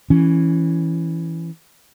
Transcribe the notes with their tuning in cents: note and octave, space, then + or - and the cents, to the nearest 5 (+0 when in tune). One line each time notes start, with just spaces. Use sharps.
E3 +0 C#4 +0